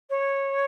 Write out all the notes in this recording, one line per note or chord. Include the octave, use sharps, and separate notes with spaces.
C#5